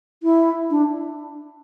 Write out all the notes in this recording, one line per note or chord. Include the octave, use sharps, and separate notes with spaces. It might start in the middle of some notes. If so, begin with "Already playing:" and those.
E4
D4